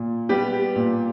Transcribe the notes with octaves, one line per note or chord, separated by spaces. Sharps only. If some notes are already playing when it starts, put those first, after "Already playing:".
Already playing: A#2
G3 B3 G4
A#2